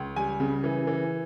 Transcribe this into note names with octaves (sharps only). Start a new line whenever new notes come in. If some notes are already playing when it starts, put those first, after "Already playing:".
Already playing: C#2
G3 G#5
C#3
E3
E3